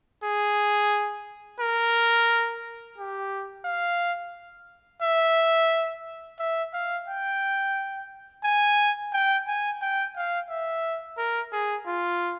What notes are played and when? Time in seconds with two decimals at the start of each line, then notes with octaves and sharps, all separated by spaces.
0.24 G#4
1.60 A#4
2.98 G4
3.65 F5
5.02 E5
6.40 E5
6.74 F5
7.08 G5
8.44 G#5
9.13 G5
9.47 G#5
9.82 G5
10.16 F5
10.50 E5
11.18 A#4
11.53 G#4
11.87 F4